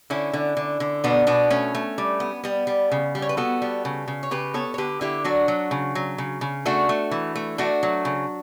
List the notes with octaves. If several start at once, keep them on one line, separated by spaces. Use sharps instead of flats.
D3 C#4 E4
D3
D3
D3
B2 B3 D4
B2 B3 D4
A3 C#4
A3
G3
B3
G3 B3
G3
C#3
G3
C#5
B4
B3 F#4 A4
G3
C#3
C#3
C#5
C#3 G4 B4
B3 A4 C#5
C#5
D3 G4 B4
D3 E4 G4
F#3 D4 F#4
F#3
C#3
F#3
C#3
C#3
A3 D4 F#4
A3
E3
A3
A3 D4 F#4
F#3
C#3